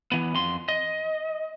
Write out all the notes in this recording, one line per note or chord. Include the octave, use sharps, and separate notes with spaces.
E3 B3
F2 C6
D#5